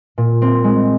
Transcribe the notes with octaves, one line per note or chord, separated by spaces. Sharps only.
A#2
C4
G#3